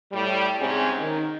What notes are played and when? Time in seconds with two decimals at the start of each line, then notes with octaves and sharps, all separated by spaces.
0.12 A2 G3
0.59 G#2 C3 C4 C#4 G#4
0.99 D#3